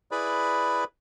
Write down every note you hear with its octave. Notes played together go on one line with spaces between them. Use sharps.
E4 G#4 B4 D5 B5